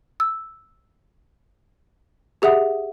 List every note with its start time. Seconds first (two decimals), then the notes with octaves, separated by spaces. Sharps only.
0.20 E6
2.42 G4 G#4 E5 F#5 D#6